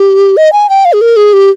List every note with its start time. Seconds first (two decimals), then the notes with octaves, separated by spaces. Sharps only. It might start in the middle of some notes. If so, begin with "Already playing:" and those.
Already playing: G4
0.37 D#5
0.53 G#5
0.69 G5
0.85 F5
0.93 G#4
1.01 A#4
1.16 G#4
1.33 G4